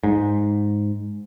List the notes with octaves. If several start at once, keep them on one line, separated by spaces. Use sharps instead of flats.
G#2